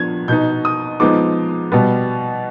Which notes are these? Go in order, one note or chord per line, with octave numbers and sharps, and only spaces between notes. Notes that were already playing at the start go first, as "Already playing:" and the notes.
Already playing: F3 B3 D4 G#6
B2 B3 D#4 G6
D#6
F3 G#3 B3 D#4 D6
B2 G3 B3